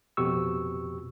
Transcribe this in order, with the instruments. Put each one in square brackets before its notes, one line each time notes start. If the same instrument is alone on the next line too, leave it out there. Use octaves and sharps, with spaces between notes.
[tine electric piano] F2 B2 G4 C#6 E6